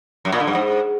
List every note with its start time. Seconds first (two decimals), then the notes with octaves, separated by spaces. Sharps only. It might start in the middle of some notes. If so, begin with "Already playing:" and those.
0.25 F#2
0.32 A#2
0.40 D3
0.47 G2
0.55 G#2